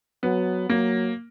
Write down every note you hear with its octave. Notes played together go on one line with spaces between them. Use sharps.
F#3 B3
F#3 A#3